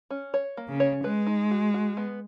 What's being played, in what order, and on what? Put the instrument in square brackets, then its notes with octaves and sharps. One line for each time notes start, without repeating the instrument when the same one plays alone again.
[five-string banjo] C#4
C#5
A#3
[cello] C#3
[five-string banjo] C#5
[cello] G#3 [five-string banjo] B4
[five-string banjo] D#4
F#4
F#4
B3